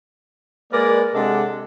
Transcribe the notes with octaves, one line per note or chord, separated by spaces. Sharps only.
G#3 A#3 A#4 B4 D5
C3 G#3 D4 A4 D5 F#5